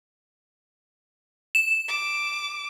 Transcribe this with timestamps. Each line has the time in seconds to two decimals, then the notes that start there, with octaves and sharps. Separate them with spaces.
1.55 E7
1.88 D6